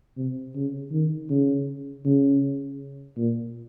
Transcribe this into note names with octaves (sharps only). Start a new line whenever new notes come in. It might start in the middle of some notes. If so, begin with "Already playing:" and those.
C3
C#3
D#3
C#3
C#3
A#2